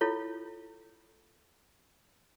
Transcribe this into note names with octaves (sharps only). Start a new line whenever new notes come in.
E4 F4 A4 C#5